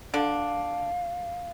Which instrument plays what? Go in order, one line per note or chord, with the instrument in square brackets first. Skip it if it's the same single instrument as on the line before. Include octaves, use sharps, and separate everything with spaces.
[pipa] D3 D4 [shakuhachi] F5